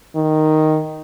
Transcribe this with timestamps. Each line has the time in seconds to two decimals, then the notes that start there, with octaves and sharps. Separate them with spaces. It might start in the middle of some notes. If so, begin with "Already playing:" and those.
0.15 D#3